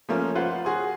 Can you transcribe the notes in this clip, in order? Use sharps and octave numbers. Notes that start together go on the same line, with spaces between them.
F3 A3 A#3 C#4
F4 B4 C5 F#5
F#4 G#4 C6